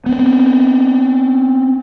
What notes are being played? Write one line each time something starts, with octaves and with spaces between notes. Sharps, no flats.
B3 C4